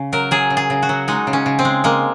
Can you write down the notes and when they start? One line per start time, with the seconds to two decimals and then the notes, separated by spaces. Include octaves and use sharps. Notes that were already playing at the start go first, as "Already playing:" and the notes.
Already playing: C#3
0.13 F#3 A#4
0.31 F#3 G#4
0.50 C#3
0.57 G#4
0.70 C#3
0.83 F#4
0.89 F#3
1.08 G#3 D#4
1.27 C#3
1.33 C#4
1.46 C#3
1.59 C4
1.65 G#3
1.84 G#3 A#3